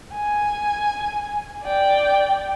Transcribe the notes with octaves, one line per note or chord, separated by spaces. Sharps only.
G#5
D5 G5